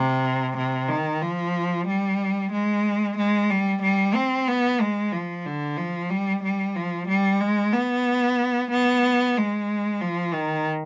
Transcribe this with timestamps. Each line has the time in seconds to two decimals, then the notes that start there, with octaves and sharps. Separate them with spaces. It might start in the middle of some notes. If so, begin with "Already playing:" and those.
Already playing: C3
0.57 C3
0.89 D#3
1.22 F3
1.87 G3
2.52 G#3
3.17 G#3
3.50 G3
3.82 G3
4.15 C4
4.48 B3
4.81 G#3
5.12 F3
5.46 D3
5.78 F3
6.10 G3
6.43 G3
6.76 F3
7.08 G3
7.40 G#3
7.73 B3
8.71 B3
9.37 G#3
10.01 F3
10.34 D#3